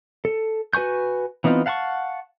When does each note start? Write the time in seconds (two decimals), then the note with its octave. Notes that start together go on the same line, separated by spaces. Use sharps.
0.25 A4
0.73 F#4 B4 G#5 C#6 G6
1.44 E3 B3 C4 D#4 F4
1.66 F5 F#5 A5 B5 C#6